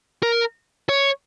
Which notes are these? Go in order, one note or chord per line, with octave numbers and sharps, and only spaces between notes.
A#4
C#5